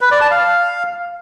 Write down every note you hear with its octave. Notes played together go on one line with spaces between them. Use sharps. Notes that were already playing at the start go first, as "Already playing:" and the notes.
B4
D5
A5
F5